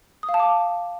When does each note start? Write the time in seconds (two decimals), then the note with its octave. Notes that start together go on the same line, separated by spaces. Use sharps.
0.23 D#6
0.29 F5
0.34 A5
0.40 D6